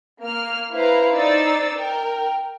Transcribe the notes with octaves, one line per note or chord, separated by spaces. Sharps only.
A#3 F6
E4 B4 C5 F5 A#5
D#4 C5 D5 E6 A6
A#4 G5